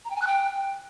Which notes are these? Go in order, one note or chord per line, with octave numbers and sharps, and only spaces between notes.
A#5
G5
G#5
F#6
G5